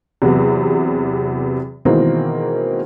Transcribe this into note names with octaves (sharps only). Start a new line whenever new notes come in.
E2 C3 F#3 B3
B2 D#3 E3 G#3 A#3 C4